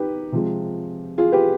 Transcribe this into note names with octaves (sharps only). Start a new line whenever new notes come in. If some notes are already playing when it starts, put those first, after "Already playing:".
Already playing: D#4 G4 B4
C3 F3 G#3
F4 G#4
G4 B4